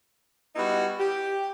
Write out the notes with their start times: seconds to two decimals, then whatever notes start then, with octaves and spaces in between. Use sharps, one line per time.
0.55 G3 B3 D#4 E4 F#4
0.99 G4